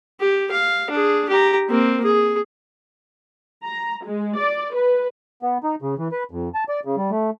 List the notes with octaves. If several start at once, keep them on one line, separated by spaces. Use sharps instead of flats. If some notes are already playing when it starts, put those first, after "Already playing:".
G4
F5
D4 G#4
G4 A#5
A#3 C4
G#4
A#5
G#3
D5
B4
B3
D#4
C#3
E3
B4
F2
A5
D5
C#3
G3
A3